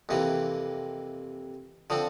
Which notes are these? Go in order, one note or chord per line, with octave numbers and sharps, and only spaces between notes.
F2 C3 E3 A#3
D3 F3 C4